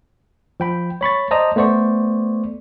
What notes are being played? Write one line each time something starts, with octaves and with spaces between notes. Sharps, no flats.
F3 G5 B5
C#5 B5 C#6 A6
C5 D5 D#5 A5 A#5 D#6
A3 B3 C5 D5 C#6